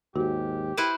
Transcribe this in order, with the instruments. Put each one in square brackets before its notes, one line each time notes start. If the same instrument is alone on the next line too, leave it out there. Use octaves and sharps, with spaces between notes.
[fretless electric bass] D#2 G#2 [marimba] F#4 [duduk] G4
[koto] E4 B4 C5